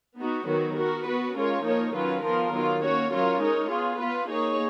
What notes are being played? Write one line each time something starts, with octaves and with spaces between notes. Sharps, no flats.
B3 D#4 F#4
D#3 F#3 B3 F#4
B3 F#4 A#4
B3 F#4 B4
G#3 C#4 F4 A#4 C#5
F3 A#3 D#4 A#4 C#5
D#3 F#3 C#4 F4 B4
F3 B3 F4 A#4
D#3 F#3 B3 F4
A#3 C#4 F#4 C#5
F#3 C#4 F4 A#4 C#5
G#3 D#4 A#4 C#5
B3 F4 G#4
B3 F4 B4
A#3 D#4 G#4 C#5